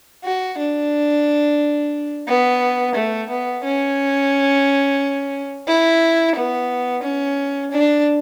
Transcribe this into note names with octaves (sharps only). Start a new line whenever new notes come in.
F#4
D4
B3
A3
B3
C#4
E4
B3
C#4
D4